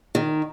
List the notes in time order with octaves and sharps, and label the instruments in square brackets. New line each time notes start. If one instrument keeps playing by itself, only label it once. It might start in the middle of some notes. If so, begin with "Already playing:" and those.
[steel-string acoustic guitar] D#3